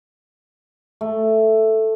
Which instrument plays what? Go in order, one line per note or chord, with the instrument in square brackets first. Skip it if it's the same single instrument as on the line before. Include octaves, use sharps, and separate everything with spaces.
[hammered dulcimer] A3